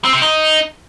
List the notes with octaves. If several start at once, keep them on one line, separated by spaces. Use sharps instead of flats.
C4
C3
D#4